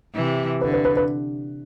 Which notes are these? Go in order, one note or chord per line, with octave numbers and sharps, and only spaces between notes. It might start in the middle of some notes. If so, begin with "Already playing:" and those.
C3 E3
D3 B4
B4
B4
B4